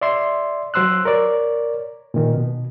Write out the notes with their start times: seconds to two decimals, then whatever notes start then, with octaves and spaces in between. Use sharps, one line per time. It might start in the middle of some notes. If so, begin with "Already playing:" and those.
0.01 D5 E5 C6
0.74 F#3 C5 C6 E6 F#6
1.05 A#4 C#5 D5
2.14 A#2 D#3
2.34 B2